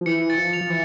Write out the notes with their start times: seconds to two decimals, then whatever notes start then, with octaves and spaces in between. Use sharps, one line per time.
0.01 F3
0.06 E3 C#7
0.30 A6
0.38 F3
0.53 F7
0.61 F3
0.70 E3